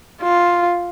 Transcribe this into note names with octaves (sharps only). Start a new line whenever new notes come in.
F4